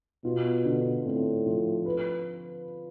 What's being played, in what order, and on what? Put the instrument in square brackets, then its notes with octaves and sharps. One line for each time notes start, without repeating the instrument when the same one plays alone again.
[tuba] B2 [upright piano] F4
[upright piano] D3
[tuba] A2 [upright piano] C4
[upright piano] F3
B4